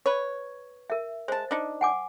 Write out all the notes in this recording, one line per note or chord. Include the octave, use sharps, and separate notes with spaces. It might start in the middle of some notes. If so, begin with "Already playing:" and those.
B4 C#5
A#4 E5
G#3 C5 A5
D4 D#4
F#5 G#5 D6